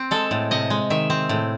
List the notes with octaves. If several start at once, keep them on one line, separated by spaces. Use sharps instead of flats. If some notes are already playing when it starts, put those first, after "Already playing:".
Already playing: C4
G#3 A4
A2
C3 D#5
G#3
D#3 E5
C4
A2